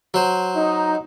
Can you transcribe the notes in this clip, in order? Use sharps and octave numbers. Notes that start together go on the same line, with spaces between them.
F#3 C5
D#4